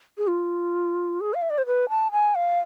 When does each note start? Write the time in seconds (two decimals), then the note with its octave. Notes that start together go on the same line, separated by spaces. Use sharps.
0.18 G#4
0.28 F4
1.21 G#4
1.34 F5
1.42 E5
1.50 D5
1.58 C5
1.66 B4
1.89 A5
2.12 G#5
2.35 F5